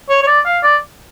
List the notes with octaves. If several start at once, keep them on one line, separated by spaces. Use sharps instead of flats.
C#5
C#5
D5
F5
D5